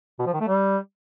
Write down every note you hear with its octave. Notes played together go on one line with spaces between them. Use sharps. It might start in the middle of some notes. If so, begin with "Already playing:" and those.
B2
F3
D#3
A3
G3